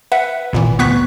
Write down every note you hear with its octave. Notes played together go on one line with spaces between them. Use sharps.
B4 E5 F#5
G#1 A#2 E3
G1 D2 B3 C#6 F#6 B6